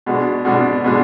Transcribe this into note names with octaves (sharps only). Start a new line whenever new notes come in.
B2 G#3 D4 F#4
B2 G#3 D4 F#4
B2 G#3 D4 F#4